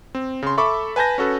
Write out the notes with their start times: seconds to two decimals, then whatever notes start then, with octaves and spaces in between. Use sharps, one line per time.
0.15 C4
0.42 C#3 C6
0.58 A4 E5 B5 C#6 D6
0.96 B4 G#5 A5 G6 A#6
1.18 C#4 F#4 A4 B4